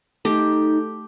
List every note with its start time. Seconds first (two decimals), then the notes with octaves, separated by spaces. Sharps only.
0.25 A3 D#4 G4 A4